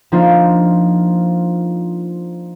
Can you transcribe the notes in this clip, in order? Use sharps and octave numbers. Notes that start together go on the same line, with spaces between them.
F3 A#3 D4 D#4 F4